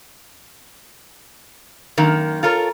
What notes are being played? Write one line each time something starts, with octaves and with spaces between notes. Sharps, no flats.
F#2 D#3 A#3
F4 A4 A#4 C#5